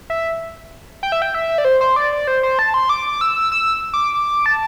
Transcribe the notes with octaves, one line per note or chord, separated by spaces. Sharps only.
E5
G5
E5
G5
E5
D5
C5
C5
D5
D5
C5
C5
A5
C6
D6
E6
E6
D6
D6
A5